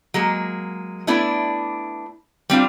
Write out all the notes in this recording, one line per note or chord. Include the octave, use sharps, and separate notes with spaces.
F#3 G#3 A#3
A3 B3 D4 E4 D5
G3 C4 D4 F4